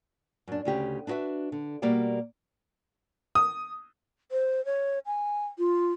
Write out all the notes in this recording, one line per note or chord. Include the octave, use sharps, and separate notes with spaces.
F#2 D4
D2 C#3 G4
D4 E4 F#4 B4 E5
D3
B2 G3 A#3 F#4 D5 F5
D#6
C5
C#5
G#5
F4